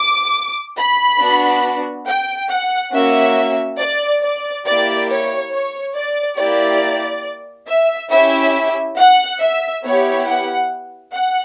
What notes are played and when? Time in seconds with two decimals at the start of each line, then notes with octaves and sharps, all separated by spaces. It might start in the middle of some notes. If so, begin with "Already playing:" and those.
Already playing: D6
0.77 B5
1.21 B3 D4 F#4
2.07 G5
2.50 F#5
2.93 A#3 C#4 F#4 E5
3.79 D5
4.22 D5
4.66 A#3 E4 G4 D5
5.09 C#5
5.52 C#5
5.95 D5
6.38 A#3 E4 G4 D5
7.68 E5
8.11 C#4 E4 G4 E5
8.97 F#5
9.41 E5
9.84 B3 E4 G4 C#5
10.27 F#5
11.13 F#5